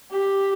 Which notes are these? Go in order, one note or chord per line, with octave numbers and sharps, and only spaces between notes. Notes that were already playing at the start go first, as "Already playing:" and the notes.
G4